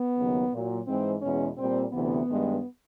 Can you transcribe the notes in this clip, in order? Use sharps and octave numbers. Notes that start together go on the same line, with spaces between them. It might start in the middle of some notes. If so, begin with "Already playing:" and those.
Already playing: B3
D#2 C#3 F#3
A#2
F#3
G#2 E3 G#3 C4
E2 B2 G#3 C#4
A#2 G3 C4
D2 C3 E3 B3
G2 D#3 G#3